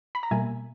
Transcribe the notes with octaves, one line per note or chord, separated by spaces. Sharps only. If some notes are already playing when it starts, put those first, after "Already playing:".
B5
A#5
B2 G3 A#3 E5 G#5